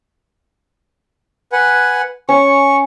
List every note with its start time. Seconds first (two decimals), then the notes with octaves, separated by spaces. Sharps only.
1.52 B4 F#5 G#5
2.29 C#4 C#6